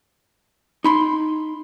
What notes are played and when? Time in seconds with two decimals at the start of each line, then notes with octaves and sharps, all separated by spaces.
0.84 D#4 B5 C6